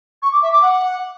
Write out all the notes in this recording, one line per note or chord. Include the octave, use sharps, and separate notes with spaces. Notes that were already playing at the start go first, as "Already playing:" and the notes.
C#6
D6
E5
D6
F#5